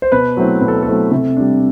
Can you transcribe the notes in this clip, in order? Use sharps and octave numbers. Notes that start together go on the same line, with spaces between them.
C5
B2 B4
F#3 A3 C4 E4
B2 B4
A4
A4
F#3 A3 C4 E4
C3 A4
G3 D4